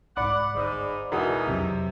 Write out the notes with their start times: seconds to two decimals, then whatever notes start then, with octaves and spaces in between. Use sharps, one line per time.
0.17 C2 G#2 D5 F#5 B5 D6
0.55 G1 G#2 D#6
1.12 E1 E3 D#4 F#4 A#4 G#5 D#6
1.47 C2 F2 C3 F#3